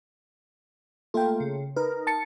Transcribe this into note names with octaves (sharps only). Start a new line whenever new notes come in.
A3 A#3 F4 A4 G5
C#3
D#4 A#4 B4
A5 A6 C#7